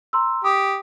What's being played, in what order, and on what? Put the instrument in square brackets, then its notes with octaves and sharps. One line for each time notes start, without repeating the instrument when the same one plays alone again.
[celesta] A#5 C6 E6
[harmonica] G4 [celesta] D#6